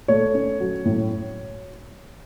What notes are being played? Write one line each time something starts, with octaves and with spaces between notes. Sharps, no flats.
A3 C#5
C#4
F#3
A2